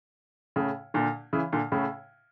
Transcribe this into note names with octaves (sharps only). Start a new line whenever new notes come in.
A2 C#3
A#2 D3
C#3 E3
A#2 D3
A2 C#3